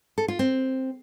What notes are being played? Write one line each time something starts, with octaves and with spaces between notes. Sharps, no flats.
A4
F4
C4